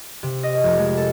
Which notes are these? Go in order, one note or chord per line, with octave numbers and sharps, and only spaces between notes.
C3
D#5
F1
G#3
A4